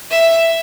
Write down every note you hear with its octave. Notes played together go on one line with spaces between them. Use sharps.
E5